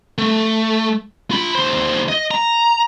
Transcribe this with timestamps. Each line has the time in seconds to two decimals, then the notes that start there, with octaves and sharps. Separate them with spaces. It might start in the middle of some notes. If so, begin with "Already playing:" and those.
0.18 A3
1.31 F4 B5
1.55 D#2 C5
2.09 D#5
2.31 A#5